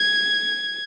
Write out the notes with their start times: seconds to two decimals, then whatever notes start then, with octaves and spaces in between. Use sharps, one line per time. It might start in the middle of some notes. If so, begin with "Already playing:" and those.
Already playing: G#6